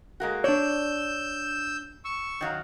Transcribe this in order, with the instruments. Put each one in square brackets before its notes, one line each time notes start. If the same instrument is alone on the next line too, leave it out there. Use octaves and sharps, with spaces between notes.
[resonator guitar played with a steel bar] G#3 A#3 F#4
[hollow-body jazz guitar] D4 C#5 [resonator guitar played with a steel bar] D5 [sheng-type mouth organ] E6 G6
[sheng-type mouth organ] C#6 E6
[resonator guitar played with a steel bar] D#3 F#3 F5